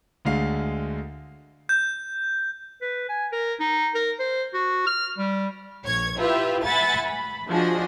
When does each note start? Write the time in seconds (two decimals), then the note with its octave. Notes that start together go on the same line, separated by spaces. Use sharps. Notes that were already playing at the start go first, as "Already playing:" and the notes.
0.25 D2 D3 G#3 F5 C7
1.69 G6
2.82 B4
3.09 G#5
3.32 A#4
3.60 D#4
3.95 A#4
4.19 C5
4.54 F#4
4.87 F6
5.18 G3
5.85 A#1 C#5 G#6
6.18 E4 F4 G4 B4 E5
6.64 E5 F#5 G#5 B5 A6
7.05 B5
7.50 F3 D4 F#4 G#4 D#5